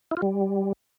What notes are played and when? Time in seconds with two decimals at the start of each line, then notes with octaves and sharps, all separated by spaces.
0.11 E4
0.17 F4
0.22 G3